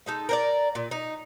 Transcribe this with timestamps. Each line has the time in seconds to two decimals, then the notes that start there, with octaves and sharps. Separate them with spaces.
0.06 G#3 D#4 A4
0.29 A#4 C5 D5
0.75 A#2
0.91 D#4